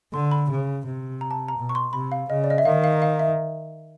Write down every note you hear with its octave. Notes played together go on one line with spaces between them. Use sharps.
D3 C6
B5
C#3
C3
A#5
A5
A#5
B2
C#6
C6
C3 B5
F5
C#3 D#5
D5
D#5
E5
D#3 F5
F5
F5
E5